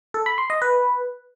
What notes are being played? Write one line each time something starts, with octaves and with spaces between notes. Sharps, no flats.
A4
B5
C6
D#5
B4